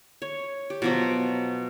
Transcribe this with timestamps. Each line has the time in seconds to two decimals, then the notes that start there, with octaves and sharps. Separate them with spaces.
0.22 C#5
0.70 G4
0.82 B2 F3 F#3